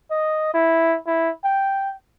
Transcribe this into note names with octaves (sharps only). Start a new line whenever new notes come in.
D#5
E4
E4
G5